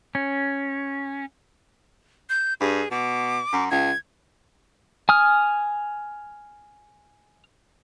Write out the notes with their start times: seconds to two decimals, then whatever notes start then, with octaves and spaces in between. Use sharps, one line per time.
0.15 C#4
2.30 G6
2.60 G2 G#4
2.91 B2 D6
3.53 F#2
3.71 C#2 G#6
5.09 G#5 D#6 F6